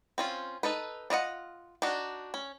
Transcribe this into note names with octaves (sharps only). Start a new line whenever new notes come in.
C4 C#4 F4
D#4 A4 B4
D4 F4 D#5 F#5
D4 D#4 F#4
C#4